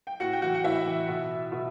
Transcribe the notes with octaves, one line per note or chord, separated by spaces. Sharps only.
G5
A2 F#4 F#5
G5
E3 F#4 F#5
F#5
A2 E4 E5
E3
B2
B2